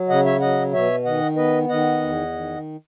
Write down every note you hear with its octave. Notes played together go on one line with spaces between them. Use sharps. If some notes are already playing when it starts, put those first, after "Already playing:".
Already playing: F#3
C#3 D#5 F#5
C#5 E5
F#3 D#5 F#5
B2 C#5 E5
D#3 D#5 F#5
B3 B4 D#5
D#3 D#5 F#5
E2
D#3